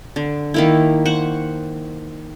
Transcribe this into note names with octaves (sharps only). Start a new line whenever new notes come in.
D3
D#3 A#3 E4
C5 F#5 C#6